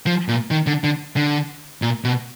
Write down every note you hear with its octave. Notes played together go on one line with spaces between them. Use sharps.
F3
A#2
D#3
D3
D3
D3
A#2
B2